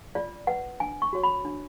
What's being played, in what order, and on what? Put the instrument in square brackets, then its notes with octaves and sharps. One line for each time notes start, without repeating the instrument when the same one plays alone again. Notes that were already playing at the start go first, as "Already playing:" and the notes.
[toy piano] F4 D5
B4 F#5
D4 G#5
C#6
F#4 C#5
B5
D4